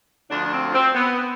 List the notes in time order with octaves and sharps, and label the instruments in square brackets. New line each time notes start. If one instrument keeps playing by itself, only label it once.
[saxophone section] D2 D3 F3 D4
D4
C4
C4
B3